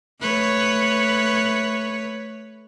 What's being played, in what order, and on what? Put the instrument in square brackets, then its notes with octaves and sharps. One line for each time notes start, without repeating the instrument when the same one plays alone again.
[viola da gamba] A3 B4 C#5